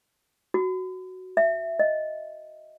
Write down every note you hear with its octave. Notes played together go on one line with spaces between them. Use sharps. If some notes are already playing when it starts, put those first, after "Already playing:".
F#4
E5
D#5